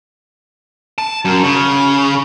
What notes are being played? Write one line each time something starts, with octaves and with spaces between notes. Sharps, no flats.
A5
F#2
C#3